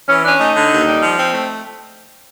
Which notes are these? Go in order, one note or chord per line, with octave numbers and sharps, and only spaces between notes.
E3 C#4
C#4 D4
A3 D#4
D3
D#2
G3
F3
C4
A3